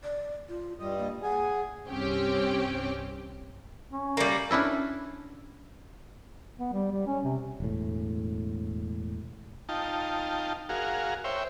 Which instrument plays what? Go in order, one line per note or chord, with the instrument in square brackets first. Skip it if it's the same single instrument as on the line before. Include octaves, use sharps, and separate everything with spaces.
[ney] D5
F4
[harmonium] G2 G3 D#5 [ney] F4
[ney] A#3
[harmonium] G#4 G#5 [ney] F#5
[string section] C2 G2 C4 C#4 G4 G5
[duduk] C#4
[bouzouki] G3 A#3
[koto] C#4 D4 E4 A4
[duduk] B3
G3
G3
C#4
C3
[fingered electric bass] E1 A2
[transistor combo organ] D#4 F4 G5 A5
F#4 G#4 A#4 F5
C5 C#5 E5 G5